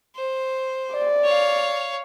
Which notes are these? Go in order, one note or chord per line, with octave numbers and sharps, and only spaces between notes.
C5
D5
C#5 F5